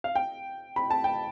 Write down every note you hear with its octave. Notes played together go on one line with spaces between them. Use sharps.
F5
G5
B5
A5
G5